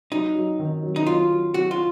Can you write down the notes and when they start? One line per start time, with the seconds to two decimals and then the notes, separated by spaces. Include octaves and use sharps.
0.11 F#3 D#4
0.35 F#3
0.59 D#3
0.83 F#3
0.96 D#4
1.07 F#3 F4
1.31 F#3
1.54 F#3 F#4
1.71 F4